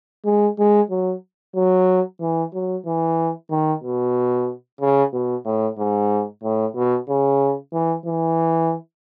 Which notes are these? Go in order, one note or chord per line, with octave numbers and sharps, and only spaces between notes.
G#3
G#3
F#3
F#3
E3
F#3
E3
D#3
B2
C#3
B2
A2
G#2
A2
B2
C#3
E3
E3